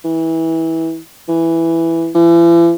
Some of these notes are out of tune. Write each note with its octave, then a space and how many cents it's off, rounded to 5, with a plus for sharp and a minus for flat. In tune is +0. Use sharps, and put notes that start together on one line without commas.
E3 -20
E3 +5
E3 +40